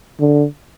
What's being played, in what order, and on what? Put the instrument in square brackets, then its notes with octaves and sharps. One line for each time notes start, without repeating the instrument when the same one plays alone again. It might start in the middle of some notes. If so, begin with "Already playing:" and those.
[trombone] D3